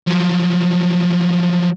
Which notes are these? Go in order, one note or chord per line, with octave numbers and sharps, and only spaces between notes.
F3 F#3